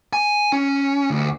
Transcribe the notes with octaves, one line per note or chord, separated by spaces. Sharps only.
G#5
C#4
D2